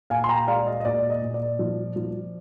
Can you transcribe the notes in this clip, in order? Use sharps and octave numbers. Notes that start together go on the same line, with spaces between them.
A#2 F5 G#5
C6
G5 A#5
G#3 D5 F5
D#5
D#5
A#2 D5
D#5
A#2
D5
F3
F3